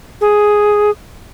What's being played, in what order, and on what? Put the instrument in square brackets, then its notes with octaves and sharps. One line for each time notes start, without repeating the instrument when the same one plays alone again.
[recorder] G#4